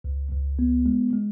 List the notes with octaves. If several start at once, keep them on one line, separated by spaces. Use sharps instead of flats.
C#2
C#2
B3
G#3
G#3